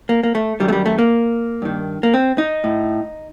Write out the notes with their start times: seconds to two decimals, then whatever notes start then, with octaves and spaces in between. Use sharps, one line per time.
0.09 A#3
0.23 A#3
0.35 A3
0.60 F#2 D#3 G3
0.68 A3
0.73 G3
0.86 A3
0.99 A#3
1.62 G2 D#3
2.03 A#3
2.14 C4
2.38 D#4
2.64 A2